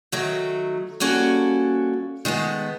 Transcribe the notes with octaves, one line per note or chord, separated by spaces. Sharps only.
D#3 F#3 A3
G3 A#3 C#4 F#4 A4
D#3 G#3 A3 B3